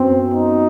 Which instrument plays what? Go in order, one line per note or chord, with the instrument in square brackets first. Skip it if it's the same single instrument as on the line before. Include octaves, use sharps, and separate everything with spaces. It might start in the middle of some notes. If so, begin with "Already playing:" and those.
Already playing: [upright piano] F#2 F#3 B3 [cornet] C4
[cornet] D#4